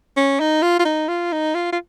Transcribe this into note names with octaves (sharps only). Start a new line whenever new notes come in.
C#4
D#4
F4
F4
D#4
F4
D#4
F4
F4